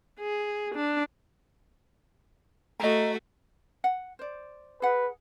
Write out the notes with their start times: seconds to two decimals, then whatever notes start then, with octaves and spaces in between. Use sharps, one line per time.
0.20 G#4
0.75 D4
2.80 A3 F#4 D#5 A#5
3.84 F#5
4.19 C5 D5
4.82 G#4 B4 F#5